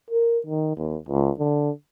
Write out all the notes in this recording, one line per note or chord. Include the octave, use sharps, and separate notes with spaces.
A#4
D#3
D#2
C#2
D3